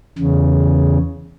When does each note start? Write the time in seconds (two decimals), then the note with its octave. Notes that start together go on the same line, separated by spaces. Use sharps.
0.19 E2 C#3